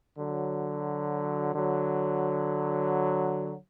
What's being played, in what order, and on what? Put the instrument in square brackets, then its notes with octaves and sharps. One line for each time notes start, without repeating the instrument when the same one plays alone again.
[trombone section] D3 F#3
D3 F#3